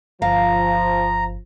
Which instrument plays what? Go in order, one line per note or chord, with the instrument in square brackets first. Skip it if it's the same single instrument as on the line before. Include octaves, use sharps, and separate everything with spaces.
[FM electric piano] G1 [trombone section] F3 [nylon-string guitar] F5 [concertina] A#5